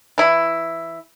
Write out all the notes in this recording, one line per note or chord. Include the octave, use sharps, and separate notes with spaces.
E3 E4